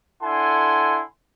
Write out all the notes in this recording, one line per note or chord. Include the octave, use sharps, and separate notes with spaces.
D4 E4 A4 F#5 G#5 C6